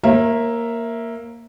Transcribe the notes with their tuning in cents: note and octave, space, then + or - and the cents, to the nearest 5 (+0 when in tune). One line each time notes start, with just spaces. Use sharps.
A#3 +0 C#5 -40 E5 +0